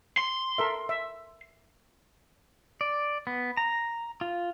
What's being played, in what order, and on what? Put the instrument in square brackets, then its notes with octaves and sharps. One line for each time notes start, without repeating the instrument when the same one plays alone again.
[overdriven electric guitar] C6
[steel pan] A4 A#4 E5
E5
[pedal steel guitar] D5
B3
A#5
F4